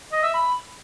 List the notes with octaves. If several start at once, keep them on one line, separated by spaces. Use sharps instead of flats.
D#5
E5
B5